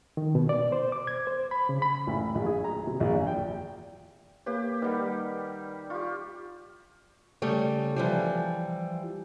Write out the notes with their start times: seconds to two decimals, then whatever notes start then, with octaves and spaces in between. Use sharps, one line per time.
0.17 D#3
0.35 B2
0.49 D5
0.72 C5
0.92 D6
1.07 G#6
1.27 C5
1.51 B5
1.69 C#3
1.82 B5
2.07 A1
2.35 A#1
2.46 G#4
2.64 A#5
2.87 C3
3.00 A#1
3.13 E2
3.27 G5
4.46 A#3 G4 B4 C#5
4.82 D#3 G3 B4 F#5
5.90 F4 G4 C#6
7.42 C#3 G3 A3 C#5
7.96 E3 F3 G3